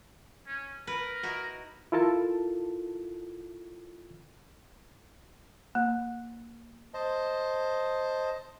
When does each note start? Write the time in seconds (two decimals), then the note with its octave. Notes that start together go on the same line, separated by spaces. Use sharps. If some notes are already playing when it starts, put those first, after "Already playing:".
0.47 C#4
0.87 A#4 B4
1.23 D#4 E4 F#4
1.92 E4 F4 A4 A#4 A5
5.75 A#3
6.94 C5 D#5 A5